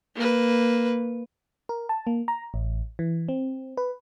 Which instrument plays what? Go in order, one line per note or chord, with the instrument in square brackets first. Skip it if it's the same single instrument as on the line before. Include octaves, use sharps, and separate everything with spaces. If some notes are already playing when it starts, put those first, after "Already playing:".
[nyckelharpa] A#3 B4
[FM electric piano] A#4
A5
A#3
A#5
A1
E3
C4
B4